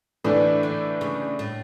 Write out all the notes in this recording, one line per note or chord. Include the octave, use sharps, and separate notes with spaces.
A2 D3 E3 A3 D4
D3
C#3
A2